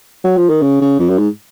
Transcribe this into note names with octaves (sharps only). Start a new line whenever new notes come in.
F#3
F3
D#3
C#3
C#3
F2
F#2
G#2